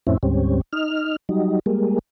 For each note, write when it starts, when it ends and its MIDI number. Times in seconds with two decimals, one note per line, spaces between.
0.07 0.17 41
0.07 0.17 45
0.07 0.17 60
0.07 0.17 61
0.07 0.17 64
0.23 0.61 38
0.23 0.61 44
0.23 0.61 55
0.23 0.61 60
0.23 0.61 61
0.73 1.16 63
0.73 1.16 89
1.29 1.59 54
1.29 1.59 55
1.29 1.59 63
1.66 1.99 55
1.66 1.99 56
1.66 1.99 58